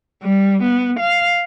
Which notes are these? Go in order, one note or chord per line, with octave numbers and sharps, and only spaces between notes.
G3
B3
F5